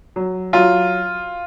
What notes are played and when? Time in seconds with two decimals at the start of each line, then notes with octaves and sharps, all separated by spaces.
0.16 F#3
0.53 F#3 F4